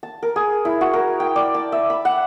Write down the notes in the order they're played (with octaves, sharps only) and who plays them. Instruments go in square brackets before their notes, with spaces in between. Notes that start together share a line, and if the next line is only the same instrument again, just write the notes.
[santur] A5
A#4
G#4
E4
F#4
A#4
G5
D5
A5
E5
B5
F#5